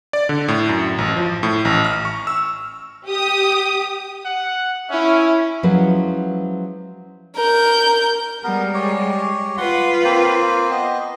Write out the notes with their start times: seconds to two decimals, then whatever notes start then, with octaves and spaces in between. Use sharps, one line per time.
0.13 D5
0.29 D3
0.48 A2
0.69 F#2
0.98 A1
1.17 F3
1.43 A2
1.65 A1
1.84 F6
2.05 C#6
2.27 E6
3.07 G4 D#6
4.26 F#5
4.91 C#4 E4
5.63 F3 F#3 G#3 C#4 E4 B4
7.37 A#4 G6
8.44 G3 G#3 B3 A#4
8.74 G4 C#5
9.58 F4 B4 F#5 C6
10.05 A#3 C4 C5
10.71 B3 D#5